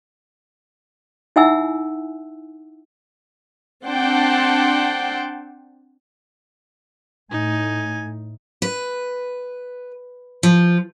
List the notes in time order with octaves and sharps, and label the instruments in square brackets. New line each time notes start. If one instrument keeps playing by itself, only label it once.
[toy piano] D#4 E4 E5 F#5 G#5 E6
[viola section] C4 D4 F#5 G5 A5 C6
[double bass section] A2 [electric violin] D#4 [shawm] G#5
[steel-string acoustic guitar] B4
F3